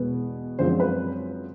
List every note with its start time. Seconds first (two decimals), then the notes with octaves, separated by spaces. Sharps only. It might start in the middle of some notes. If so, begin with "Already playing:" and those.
Already playing: E2 B2 G#3 B3
0.59 F#2 D3 F3 G#3 C4 C5
0.80 B4